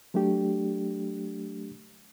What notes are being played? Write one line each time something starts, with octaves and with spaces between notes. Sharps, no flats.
F#3 A3 D4 G4